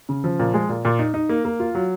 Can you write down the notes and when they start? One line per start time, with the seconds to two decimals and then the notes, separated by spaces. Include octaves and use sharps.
0.09 C#3
0.24 F3
0.40 A#2
0.54 G#3
0.69 A#2
0.85 A#2
0.99 D#4
1.14 D#4
1.29 A#3
1.45 A#3
1.60 F4
1.75 F#3